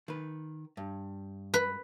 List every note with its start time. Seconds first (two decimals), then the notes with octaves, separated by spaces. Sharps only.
0.08 D#3 B4
0.77 G2
1.54 B4